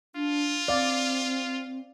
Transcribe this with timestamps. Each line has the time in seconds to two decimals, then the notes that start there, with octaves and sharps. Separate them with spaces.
0.15 D4 F4
0.68 C4 D5 F5